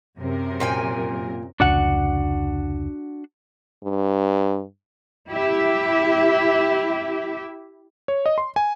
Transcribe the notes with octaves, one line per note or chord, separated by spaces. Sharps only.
F#2 C3 A#4
A#2 G5 G#5
F1 C#2 D4 F#4 F#5
G2
E4 G4 E5
C#5
D#5
C6
G#5